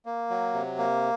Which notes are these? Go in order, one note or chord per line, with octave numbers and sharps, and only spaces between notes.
A#3
F#3
C3
A#3